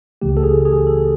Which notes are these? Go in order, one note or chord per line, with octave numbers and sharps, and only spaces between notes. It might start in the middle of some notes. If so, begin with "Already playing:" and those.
C#2 C#3 E3 A3 G4
A4
G#4
G#4
A4